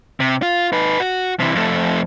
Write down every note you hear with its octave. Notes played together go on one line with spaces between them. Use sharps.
C3
F4
D#4 B4
F#4
C3 E3
F2 A3